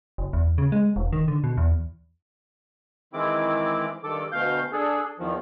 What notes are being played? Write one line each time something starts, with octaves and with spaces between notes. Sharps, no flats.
F#1
E2
C#3
G#3
E1
D#3
D3
B2
E2
D#3 E3 G#3 C4 E4 D6
G2 D#3 A4 D6
D2 B2 F5 G6
D4 G#4 A4
E2 D#3 F3